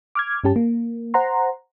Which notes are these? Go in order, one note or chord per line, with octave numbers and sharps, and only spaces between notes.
D6 F6 G#6
G2 C#4 G4 A5
A#3
C5 F#5 A#5 C6